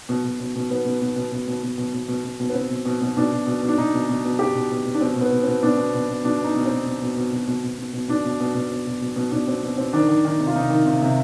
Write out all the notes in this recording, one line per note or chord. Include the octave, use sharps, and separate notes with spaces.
B2
B2
B2
B2
B2 B3
B2
B2
B2
B2
B2
B2
B2
B2
B2
B2
B2
B3
B2 C4
B2
B2
B2
B2 D4
B2
B2
B2
D4
B2 D#4
B2
B2
B2
B2 G4
B2
B2
B2
D4
B2 C4
B2
B3
B2
C4
B2
B2 D4
B2
B2
B2
B2 D4
B2 D#4
B2
C4
B2
B2
B2
B2
B2
B2
B2
B2
B2
B2 D4
B2
B2
B2
B2
B2
B2
B2
B2 D4
B2 C4
B2
B2 C4
D#3 D4
D#3
D#3
C3
F4
C3 D#4
D#3
C3 F4
C3